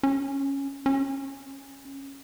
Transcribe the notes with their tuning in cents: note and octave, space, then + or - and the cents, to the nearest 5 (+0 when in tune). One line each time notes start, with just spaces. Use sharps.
C#4 -5
C#4 -15